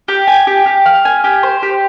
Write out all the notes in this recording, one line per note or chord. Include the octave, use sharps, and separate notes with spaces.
G4
G#5
G4
G4
F5
G#5
G4
C5
G4